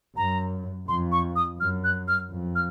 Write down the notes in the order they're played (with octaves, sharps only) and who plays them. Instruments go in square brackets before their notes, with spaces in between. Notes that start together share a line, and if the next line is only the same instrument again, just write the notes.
[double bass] F#2 [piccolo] A#5
[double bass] F2 [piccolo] C6
[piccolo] C#6
D#6
[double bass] F#2 [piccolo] F6
[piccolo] F#6
F6
[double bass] F2
[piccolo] F6